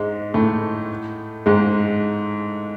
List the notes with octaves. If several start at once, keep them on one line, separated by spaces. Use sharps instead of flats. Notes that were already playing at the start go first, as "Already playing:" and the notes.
Already playing: G#2 G#3
A2 A3
G#2 G#3